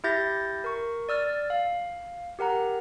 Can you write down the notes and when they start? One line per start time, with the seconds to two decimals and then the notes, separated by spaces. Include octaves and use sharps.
0.04 E4 G4 E5 G6 A6 A#6
0.64 A#4 C#6
1.09 D5 E6 F6 A6
1.50 F5
2.39 G4 A#4 F#5 A#5